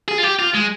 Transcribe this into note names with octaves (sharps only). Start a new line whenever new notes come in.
G#4
F4
G4
F4
G#3